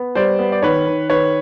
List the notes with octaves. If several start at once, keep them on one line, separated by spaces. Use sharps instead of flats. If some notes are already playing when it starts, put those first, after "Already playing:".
Already playing: B3
G3 C5 D5
B3
D5
D#3 B4 C#5
D#3
D#3 B4 C#5